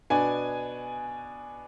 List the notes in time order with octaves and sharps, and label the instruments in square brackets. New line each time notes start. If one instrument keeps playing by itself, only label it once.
[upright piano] B2 B3 D4 G#5